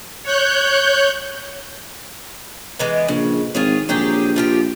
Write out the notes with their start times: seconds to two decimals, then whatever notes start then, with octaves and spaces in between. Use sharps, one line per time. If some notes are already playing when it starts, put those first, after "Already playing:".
0.23 C#5 F#6 G6
2.79 E3 G#3 B3
3.08 A#1 C#3
3.55 G#1 F4 G#4 C#5
3.89 A#1 F#3 G4 G#4
4.36 F3 F4 G4